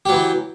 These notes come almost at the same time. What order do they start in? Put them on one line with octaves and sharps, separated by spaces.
G4 F#3 E3